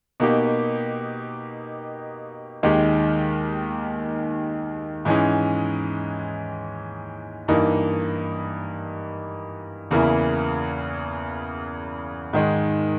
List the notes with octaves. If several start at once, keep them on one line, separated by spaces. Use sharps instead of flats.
B2 A#3 D#4 G4
D#2 D#3 G#3 D#4 G4
G#2 E3 G#3 C#4
G2 E3 A#3 D#4
E2 C#3 E3 A#3 E4
G#2 D#3 G#3